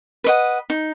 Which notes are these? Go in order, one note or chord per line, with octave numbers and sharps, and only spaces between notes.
B4 D#5 F#5
D#4